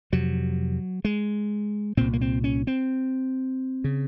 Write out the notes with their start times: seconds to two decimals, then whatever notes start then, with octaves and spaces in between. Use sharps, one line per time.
0.13 F2 C3 F#3
1.05 G#3
1.97 C2 A#2 C4
2.13 A#3
2.21 C4
2.44 C#4
2.67 C4
3.84 C#3